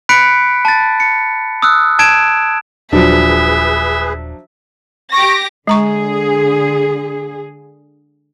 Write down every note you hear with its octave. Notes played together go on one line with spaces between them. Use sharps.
B5 F#6 B6 C#7 D7
A5 A6
C#7
D#6 E6 F#6
A5 G#6 D7 E7
D#1 F3 F#3 D4 G#4 B4 E5
G4 C#6 D6 A#6
D3 G#3 G#4 A#5 C#6